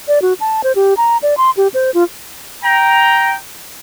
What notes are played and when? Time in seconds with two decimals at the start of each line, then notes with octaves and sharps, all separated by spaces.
0.08 D5
0.22 F#4
0.41 A5
0.64 C5
0.75 G4
0.97 A#5
1.23 D5
1.37 C6
1.57 G4
1.74 C5
1.94 F4
2.62 G5 A#5